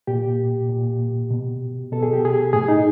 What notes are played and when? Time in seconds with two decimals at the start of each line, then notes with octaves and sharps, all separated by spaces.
0.07 A#2 G4
0.70 A#2
1.30 B2
1.92 B2 A4
2.03 G#4
2.13 G4
2.25 G#4
2.53 A2 G#4
2.68 D#4